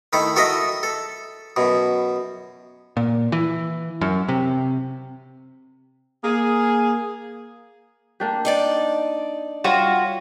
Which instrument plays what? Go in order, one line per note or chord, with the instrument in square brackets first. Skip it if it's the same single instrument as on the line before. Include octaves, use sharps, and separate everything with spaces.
[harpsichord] D#3 A3 E4 A4
F#4 A4 A#4 D#5 E5
A4
F#2 B2
[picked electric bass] A#2
E3
F#2
C3
[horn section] A#3 G#4
[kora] A#3 D4 G4
[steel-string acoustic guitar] D#4 D5 A5
[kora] G3 [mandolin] F4 F#4 C#5